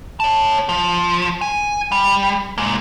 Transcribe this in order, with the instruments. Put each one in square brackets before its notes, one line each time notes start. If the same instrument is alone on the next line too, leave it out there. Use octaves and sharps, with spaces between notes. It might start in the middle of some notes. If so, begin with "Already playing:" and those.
[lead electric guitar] C#5 A5
F3
G#5
G3
G#3 A#3